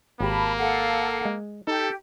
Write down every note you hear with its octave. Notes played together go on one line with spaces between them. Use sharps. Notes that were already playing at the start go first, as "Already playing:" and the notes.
G#1 A#3 G4 A5 B5
A4 F5 F#5
G#3
D#4 G4 A4